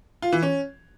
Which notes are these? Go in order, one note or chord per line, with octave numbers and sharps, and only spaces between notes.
F4
E3
C#4